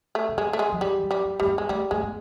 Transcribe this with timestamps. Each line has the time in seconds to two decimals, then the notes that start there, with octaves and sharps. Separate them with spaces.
0.15 A3
0.28 C#3
0.37 D3 G#3
0.53 A3
0.59 G#3
0.72 F3
0.81 E3 G3
1.03 F#3
1.11 G3
1.25 B3
1.40 G3 A#3
1.47 B3
1.58 G#3
1.69 G3 A3
1.91 G#3 A3
2.03 B3